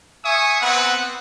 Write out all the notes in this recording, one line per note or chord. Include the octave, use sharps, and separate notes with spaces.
E5 G#5 C#6 D#6
B3 C4 B4 F#5